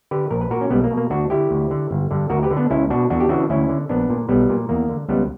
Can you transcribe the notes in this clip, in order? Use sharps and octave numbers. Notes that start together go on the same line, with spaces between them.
D3 G4 B4
A#1 A#4
B4
A#2 F#4 A#4
C#4
B1 G3 B3
A#3
B2
A#3
D2 D4 F#4
D3 E4 G4
D2
D3
G1
G2 D3
D2 F#4 A#4
G4 B4
D3
B3 D4
C#2 C#4 E4
B2 D4 F#4
E2 D4 F#4
G4
C#3 E3 D4 F#4
D2 C#4 E4
D3
A#1 B3 D4
A#2
B1 G3 B3
A#2
E2 A#3
D3
C#2 G3 B3